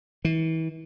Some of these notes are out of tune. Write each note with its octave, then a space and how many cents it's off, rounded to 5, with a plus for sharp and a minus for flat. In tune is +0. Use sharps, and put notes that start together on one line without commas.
E3 -35